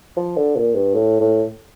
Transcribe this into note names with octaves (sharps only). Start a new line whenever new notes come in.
F3
D3
A#2
G2
A2
A2